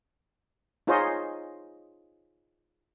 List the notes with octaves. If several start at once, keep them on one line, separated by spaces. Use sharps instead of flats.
D#4 F4 G#4 C5 C#5 D#5